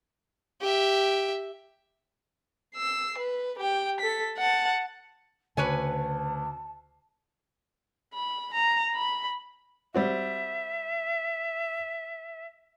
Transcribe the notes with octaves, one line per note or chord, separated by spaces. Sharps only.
G4 E5
E6 C7
B4
G4 G5
A4 B6
F#5 A5
D2 C#3 B4 C#5 G#5 A5
B5
A#5
B5
G3 C4 F#4 E5